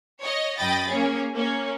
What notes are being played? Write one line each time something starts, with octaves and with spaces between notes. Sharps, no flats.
C#5 D#5
F#2 D#5 G5 B5 A6
A#3 C#4 G#4
A#3 C#4